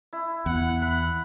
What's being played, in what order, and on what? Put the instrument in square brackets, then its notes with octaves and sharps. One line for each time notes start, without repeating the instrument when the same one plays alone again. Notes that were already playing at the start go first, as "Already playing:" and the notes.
[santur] E4
[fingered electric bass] E2 [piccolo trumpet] F#5
[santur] B5 [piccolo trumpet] F#6